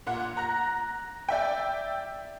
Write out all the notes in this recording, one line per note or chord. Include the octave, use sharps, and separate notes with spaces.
A#2 F#5
A#5 F#6 A#6
D5 E5 G5